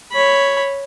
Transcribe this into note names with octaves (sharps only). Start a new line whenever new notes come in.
C#5 B5